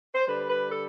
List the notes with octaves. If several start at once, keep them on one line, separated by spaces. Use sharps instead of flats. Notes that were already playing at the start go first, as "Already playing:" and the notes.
C5
D3 G3 B4
B4
A4